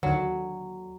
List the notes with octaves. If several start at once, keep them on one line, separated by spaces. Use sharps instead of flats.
D#2 D3 F#3